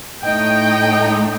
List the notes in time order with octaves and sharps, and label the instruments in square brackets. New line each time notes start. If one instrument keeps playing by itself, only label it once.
[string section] A2 A3 D#4 D#5 G5